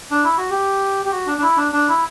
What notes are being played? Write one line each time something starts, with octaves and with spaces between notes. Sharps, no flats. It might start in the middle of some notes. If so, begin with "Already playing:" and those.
D4
E4
F#4
G4
G4
F#4
D4
D4
E4
D4
D4
E4